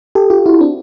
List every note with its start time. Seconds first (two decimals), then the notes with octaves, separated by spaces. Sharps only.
0.15 G4 A4
0.30 F4 G4
0.46 E4 F#4
0.61 C4 D4